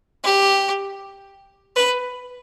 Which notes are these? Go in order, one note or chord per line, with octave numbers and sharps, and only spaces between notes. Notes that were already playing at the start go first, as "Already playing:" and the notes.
G4
B4